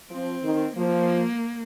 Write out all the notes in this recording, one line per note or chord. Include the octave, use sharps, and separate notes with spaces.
F3 C4
D#3
F3 A#3